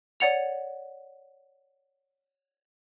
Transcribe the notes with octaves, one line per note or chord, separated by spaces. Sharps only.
C#5 D5 F#5 C#7 F7